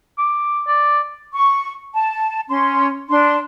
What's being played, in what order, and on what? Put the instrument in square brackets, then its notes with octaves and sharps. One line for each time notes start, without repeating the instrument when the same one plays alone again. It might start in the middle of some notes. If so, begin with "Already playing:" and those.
[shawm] D6
D5
[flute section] C#6
A5
C#4 C6
D4 C6